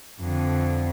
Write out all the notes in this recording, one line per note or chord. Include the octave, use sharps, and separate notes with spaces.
F2 D3